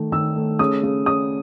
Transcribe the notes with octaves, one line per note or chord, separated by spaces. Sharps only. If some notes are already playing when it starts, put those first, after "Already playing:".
Already playing: D#3 A3
D#3 E6
A3
C#3 D#6
C#3
C#3 D#6